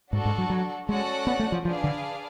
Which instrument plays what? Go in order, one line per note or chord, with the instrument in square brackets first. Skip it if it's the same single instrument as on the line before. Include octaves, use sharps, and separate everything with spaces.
[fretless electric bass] G#2 [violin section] D4 F#4 A4
[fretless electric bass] G#2
F#3
F#3
[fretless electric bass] G#3 [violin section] C#4 F#4 A4 D5 F#5
[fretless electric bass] B3
A3
F3
[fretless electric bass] F3 [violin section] D4 G#4 B4 D5 F5
[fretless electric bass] D3